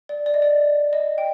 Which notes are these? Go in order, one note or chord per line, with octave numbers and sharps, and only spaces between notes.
D5
D5
D#5
D5
D#5
G5